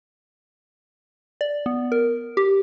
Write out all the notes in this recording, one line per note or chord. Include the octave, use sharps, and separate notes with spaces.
D5
B3
A#4
G4